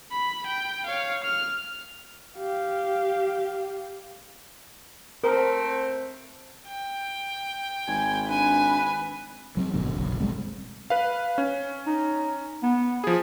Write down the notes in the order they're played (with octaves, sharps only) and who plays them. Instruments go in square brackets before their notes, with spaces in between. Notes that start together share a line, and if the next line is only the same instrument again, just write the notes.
[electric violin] B5
G5
C#5 F5
F6
[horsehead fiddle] G4 F5
[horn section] A3 C4 [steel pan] A#4
[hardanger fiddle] G5
[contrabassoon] G#1 [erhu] G#5
[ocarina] D4 [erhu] B4 [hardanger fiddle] G#5
[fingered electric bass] F#3 A#3 C4
G#1 F#2 B2 D3
F#1 B1
B2 G3 G#3 C4
[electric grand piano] B4 F5
C#4
[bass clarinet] D#4
B3
[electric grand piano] F3 G#4